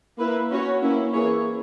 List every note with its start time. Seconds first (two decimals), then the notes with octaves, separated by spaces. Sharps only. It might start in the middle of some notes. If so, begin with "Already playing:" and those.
0.19 A#3 E4 B4
0.51 C#4 F#4 C#5
0.81 A#3 C#4 E4
1.13 E3 A#3 E4 G#4 C#5